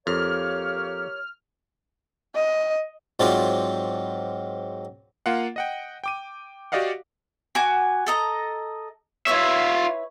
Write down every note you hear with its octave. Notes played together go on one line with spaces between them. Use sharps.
F2 A#3 G4 C#5 F6
D#5
G#2 F#3 C4 F4 D5
A#3 F4 F5 F#5
D#5 F#5 G5
G5 D6 D#7
F#4 G4 D5 D#5 F5 F#5
F#4 G#5 D6
A4 D#5 A#5
E4 F4 B4 C#5 E5